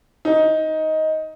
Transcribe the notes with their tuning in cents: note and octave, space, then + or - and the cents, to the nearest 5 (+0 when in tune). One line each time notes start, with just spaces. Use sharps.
D#4 +10